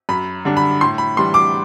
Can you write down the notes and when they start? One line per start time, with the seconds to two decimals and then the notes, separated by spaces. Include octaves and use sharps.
0.09 F#2 B5
0.45 D3 G3 D4
0.57 B5
0.81 A2 C6
0.98 B5
1.17 E3 G3 D4 C6
1.34 D6